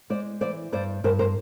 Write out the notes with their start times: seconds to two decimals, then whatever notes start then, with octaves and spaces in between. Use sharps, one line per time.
0.10 G#3 C5 D5
0.41 E3 C5 D5
0.72 G2 C5 D5
1.04 G2 A#4 C5
1.19 A#4 C5